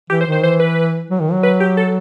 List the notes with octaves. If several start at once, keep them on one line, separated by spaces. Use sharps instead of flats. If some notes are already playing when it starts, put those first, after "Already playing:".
E3 G4
C5
D#3
C5
E3 C5
B4
F#3
D#3
F#3
B4
G4
A4